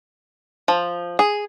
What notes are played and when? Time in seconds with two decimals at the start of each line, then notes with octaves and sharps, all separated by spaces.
0.68 F3
1.19 G#4